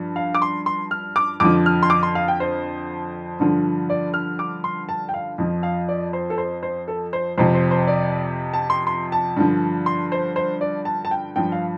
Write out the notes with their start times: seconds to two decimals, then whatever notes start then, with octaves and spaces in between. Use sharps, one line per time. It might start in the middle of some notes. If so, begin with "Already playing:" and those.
Already playing: G2 F3
0.16 F5
0.35 D6
0.42 C6
0.66 C6
0.91 F6
1.16 D6
1.40 F2 D3 F3 D6
1.66 F6
1.83 C6
1.90 D6
2.03 C6
2.15 F5
2.28 G5
2.40 C5
3.40 G2 D3 F3
3.90 D5
4.14 F6
4.39 D6
4.64 C6
4.89 A5
5.09 G5
5.14 F5
5.38 F2 F3
5.63 F5
5.89 D5
6.13 C5
6.30 A4
6.38 C5
6.63 C5
6.88 A4
7.13 C5
7.38 F2 C3 F3 C5
7.55 C5
7.71 C5
7.87 D5
8.54 A5
8.70 C6
8.87 C6
9.12 A5
9.36 G2 D3 F3
9.86 C6
10.12 C5
10.36 C5
10.61 D5
10.85 A5
11.05 A5
11.11 G5
11.36 G2 F3 G5
11.52 F5